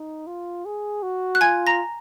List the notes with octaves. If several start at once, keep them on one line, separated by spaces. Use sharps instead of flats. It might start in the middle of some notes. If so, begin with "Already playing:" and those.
Already playing: D#4
F4
G#4
F#4
F#6
F4 G#5 G#6
A#5 A#6